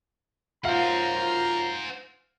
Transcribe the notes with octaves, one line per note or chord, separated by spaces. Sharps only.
F#2 F4 C5 F5 F#5 A#5